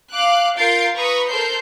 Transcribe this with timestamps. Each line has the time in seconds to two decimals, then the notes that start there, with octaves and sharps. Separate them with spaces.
0.11 F5 D6 F#6
0.55 F4 A#4 G6 A6 C7 D7
0.95 B4 A#5 B5 C#6 D#6
1.27 A4 A#4 C5 G6 C7